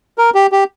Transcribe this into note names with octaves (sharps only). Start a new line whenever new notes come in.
A#4
G4
G4